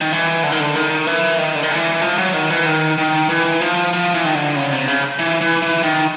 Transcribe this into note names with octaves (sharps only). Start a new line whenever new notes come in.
D#3
E3
D3
D#3
D3
D#3
E3
D#3
D3
D#3
E3
F3
F#3
D#3
E3
D#3
D#3
E3
F3
F3
E3
D#3
D3
C#3
C3
C#3
E3
E3
E3
D#3